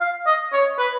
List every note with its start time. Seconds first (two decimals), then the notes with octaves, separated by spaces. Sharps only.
0.01 F5
0.26 D#5
0.53 C#5
0.78 B4